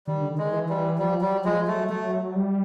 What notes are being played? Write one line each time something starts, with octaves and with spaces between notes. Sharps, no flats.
D#3 G3
D3
D#3 G#3
E3
G3
F3 G3
F#3 G3
F3 G#3
F#3 A3
F#3 A3
G3